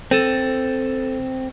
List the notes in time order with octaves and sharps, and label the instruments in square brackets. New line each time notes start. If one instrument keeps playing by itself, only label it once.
[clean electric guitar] C4 [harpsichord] A4 D#6